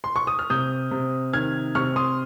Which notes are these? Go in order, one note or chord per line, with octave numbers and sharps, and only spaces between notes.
C6
C#6
D#6
F6
C3 D#6 G6
C3
D#3 F6 G#6
C3 C#6 F6
C6 D#6